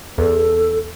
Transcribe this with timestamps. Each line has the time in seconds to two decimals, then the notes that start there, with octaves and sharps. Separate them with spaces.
0.18 E2 A4